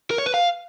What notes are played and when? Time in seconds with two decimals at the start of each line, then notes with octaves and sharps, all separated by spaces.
0.11 A#4
0.18 C#5
0.26 B4
0.34 F5